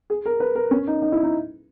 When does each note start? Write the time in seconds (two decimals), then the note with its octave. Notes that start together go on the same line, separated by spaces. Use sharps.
0.10 G#4
0.25 A#4
0.40 B4
0.55 A#4
0.71 C#4
0.87 D#4
1.02 D#4
1.12 E4
1.23 D#4